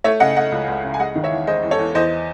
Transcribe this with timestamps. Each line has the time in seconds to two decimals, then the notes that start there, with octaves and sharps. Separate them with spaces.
0.04 A3 C#5 E5
0.20 C#3 D#5 F#5
0.36 A3 D#5 F#5
0.52 C#2
0.68 C#2
0.84 C#3
0.94 G#5
0.99 G#3 D#5 F#5
1.15 D#3
1.24 C#5 E5
1.31 E2
1.47 G#3 C5 D#5
1.63 E2
1.71 A4 C#5
1.79 E2
1.95 E2 C5 D#5